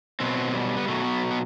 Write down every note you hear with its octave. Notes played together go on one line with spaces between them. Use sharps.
B2 F#3 C4
G3
B3
B2 F#3 A3
B3
B3